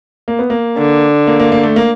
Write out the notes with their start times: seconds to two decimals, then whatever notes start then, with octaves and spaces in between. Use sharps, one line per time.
0.28 A#3
0.39 B3
0.50 A#3
0.78 D3
1.27 A#3
1.40 A#3
1.52 A#3
1.63 A3
1.76 A#3